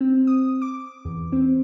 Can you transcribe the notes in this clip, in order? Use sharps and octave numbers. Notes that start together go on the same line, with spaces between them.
C4
D#6
D6
E2
C4